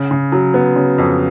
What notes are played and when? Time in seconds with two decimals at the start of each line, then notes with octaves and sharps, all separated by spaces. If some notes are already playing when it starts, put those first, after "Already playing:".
Already playing: C#3
0.11 C#3
0.32 F#3
0.54 B3
0.76 C#3
0.98 F2